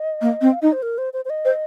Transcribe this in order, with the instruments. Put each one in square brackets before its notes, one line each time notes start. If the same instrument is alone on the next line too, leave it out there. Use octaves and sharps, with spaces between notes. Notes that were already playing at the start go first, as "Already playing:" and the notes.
Already playing: [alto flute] D#5
[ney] A#3
C4
[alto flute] F5
[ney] D#4 [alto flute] D#5
[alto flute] C5
A#4
C5
C5
C5
D#5
[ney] C5